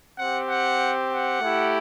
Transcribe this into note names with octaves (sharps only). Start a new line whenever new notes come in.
C4 G4 F#5
F#5
F#5
A3 E4 G4